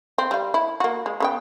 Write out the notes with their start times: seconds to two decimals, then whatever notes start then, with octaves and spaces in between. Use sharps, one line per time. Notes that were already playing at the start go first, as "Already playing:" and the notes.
0.18 C4
0.31 G3 F5
0.54 E4
0.80 A#3 F#4
1.06 G#3
1.20 C#3 B3 G5